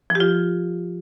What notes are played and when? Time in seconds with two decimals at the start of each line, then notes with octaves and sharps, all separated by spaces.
0.10 F3
0.15 G4
0.20 F4